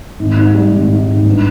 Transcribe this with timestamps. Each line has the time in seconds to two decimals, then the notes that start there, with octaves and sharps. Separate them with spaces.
0.19 G#1
0.37 G#2
0.54 G3
0.73 G#1
0.90 G#1
1.08 G#2
1.25 G2